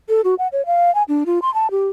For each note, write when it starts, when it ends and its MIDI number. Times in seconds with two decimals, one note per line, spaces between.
0.09 0.21 69
0.24 0.35 66
0.39 0.48 78
0.52 0.65 73
0.66 0.93 77
0.95 1.03 80
1.08 1.24 62
1.26 1.39 65
1.42 1.53 84
1.54 1.70 81
1.71 1.89 67